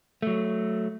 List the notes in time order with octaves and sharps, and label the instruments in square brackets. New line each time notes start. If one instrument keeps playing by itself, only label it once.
[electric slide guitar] F#3 A3